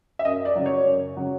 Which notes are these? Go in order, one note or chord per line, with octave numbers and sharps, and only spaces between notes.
E5
F#2 D#5
D5
C#3 F#3
C#5
F#2
C#3 F#3